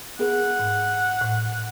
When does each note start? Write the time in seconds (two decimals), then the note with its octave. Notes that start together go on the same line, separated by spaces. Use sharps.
0.19 B3 G#4 A#4 F#5
0.59 G#2
1.21 A2